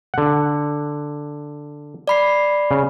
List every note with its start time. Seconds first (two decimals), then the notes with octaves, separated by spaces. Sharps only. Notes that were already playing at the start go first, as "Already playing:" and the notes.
0.14 D3 F#5
2.08 D5 B5 C7
2.71 C#3